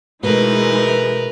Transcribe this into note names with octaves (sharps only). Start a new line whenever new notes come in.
B2 E3 G#3 A3 D#4 A#4 B4